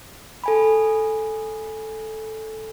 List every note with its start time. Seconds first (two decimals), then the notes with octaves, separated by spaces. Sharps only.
0.44 A4 G#5 B5